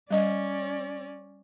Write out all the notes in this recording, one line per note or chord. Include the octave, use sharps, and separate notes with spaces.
G3 C#4 D5 D#5